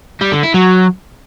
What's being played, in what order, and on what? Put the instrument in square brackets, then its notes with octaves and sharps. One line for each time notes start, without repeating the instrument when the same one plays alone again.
[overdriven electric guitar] G3
D3
E4
F#3